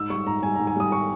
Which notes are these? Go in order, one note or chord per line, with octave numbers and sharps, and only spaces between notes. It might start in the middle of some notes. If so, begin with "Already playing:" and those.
Already playing: G#2 E6
G3 C#6
G#2 A#5
G3 G#5
G#2 A#5
G#5
G3 D#6
C#6